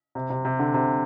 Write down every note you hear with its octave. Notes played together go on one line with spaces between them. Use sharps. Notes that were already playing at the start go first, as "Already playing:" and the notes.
C3
C3
C3
D3
C3